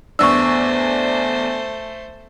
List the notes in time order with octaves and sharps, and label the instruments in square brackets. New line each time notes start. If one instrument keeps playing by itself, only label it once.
[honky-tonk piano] E2 D4 [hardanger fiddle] A3 C5 [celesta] C#6 E6